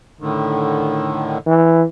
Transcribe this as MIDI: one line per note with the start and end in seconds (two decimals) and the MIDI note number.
0.20 1.38 45
0.20 1.38 50
0.20 1.38 51
1.47 1.83 52